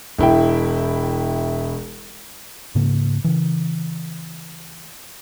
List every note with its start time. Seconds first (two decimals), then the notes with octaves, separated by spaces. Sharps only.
0.18 E1 E4 G5
2.75 G#2 C#3 A#3
3.24 C#3 E3